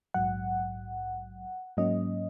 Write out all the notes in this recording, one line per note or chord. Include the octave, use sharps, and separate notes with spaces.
A#1 G#2 F#3 F#5
G#2 F#3 A#3 C#4 D#5